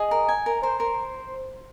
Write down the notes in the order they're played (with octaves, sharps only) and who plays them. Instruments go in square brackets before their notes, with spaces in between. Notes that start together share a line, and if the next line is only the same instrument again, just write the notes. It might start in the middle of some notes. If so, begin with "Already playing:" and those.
Already playing: [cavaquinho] G#4 [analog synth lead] D#5
[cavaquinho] A#4
G#5
A#4
[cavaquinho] A#4 [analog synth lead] C5
[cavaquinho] A#4